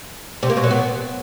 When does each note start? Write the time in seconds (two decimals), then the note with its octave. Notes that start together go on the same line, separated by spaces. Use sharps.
0.43 C3
0.50 A#3
0.57 B2
0.64 F#3
0.71 B3